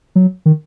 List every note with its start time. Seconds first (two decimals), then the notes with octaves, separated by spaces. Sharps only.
0.15 F#3
0.46 D#3